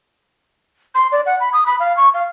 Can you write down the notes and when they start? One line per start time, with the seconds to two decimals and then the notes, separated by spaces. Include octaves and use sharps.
0.95 C6
1.12 D5
1.26 F#5
1.40 B5
1.53 D#6
1.66 B5
1.80 F5
1.97 C#6
2.14 F5